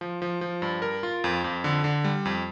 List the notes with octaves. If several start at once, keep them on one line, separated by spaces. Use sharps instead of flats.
F3
F3
F3
G2
A#4
F4
F2
F2
D3
D3
G3
F2